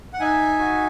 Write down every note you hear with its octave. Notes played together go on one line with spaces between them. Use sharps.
F#5
D#4 E5 G#5
F#4